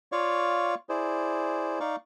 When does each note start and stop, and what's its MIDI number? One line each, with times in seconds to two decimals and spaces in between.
0.12 0.75 65
0.12 0.75 73
0.12 0.75 74
0.12 0.75 77
0.12 0.75 85
0.89 1.79 64
0.89 1.79 68
0.89 1.79 72
0.89 1.79 74
1.80 1.96 63
1.80 1.96 74
1.80 1.96 77
1.80 1.96 85